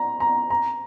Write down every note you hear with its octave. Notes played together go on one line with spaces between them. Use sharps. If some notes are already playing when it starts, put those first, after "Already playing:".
Already playing: A#5
A#5
A#5